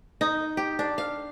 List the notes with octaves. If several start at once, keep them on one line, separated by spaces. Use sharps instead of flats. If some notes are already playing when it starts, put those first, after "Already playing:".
D#4
G4
D4
F5